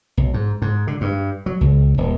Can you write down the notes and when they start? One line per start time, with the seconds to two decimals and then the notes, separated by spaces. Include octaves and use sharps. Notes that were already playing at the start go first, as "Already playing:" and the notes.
0.17 B1
0.34 G#2
0.62 G#2
0.87 D3
1.01 G2
1.46 F#3
1.61 C#2
1.98 D#1